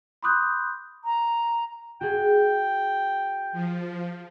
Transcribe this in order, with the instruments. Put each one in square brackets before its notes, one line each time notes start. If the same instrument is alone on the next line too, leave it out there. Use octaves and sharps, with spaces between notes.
[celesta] B5 C6 D6 D#6 F#6 G6
[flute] A#5
[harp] F#4 G#4 [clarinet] G5
[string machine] F3